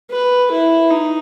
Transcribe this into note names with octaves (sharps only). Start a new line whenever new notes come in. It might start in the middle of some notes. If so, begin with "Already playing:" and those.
B4
E4
D#4